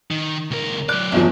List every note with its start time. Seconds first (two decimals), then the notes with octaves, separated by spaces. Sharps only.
0.11 D#3
0.51 C#2 A#4
0.89 F#3 D5 F#6
1.12 G1 E2 F3